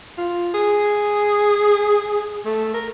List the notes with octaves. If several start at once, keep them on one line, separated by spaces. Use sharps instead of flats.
F4
G#4
A3
A#4